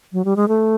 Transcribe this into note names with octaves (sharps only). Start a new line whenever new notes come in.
F#3
G3
G#3
A3